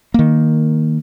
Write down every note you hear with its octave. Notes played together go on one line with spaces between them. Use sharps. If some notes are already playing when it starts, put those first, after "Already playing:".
D#3 A#3